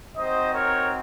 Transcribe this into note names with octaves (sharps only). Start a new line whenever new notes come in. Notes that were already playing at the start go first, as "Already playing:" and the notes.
C4 D#4 F#4 C5 D#5
A#4 C#5